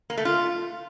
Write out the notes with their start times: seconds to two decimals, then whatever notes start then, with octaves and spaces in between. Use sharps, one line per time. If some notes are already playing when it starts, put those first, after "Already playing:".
0.10 A#3
0.18 A3
0.25 F4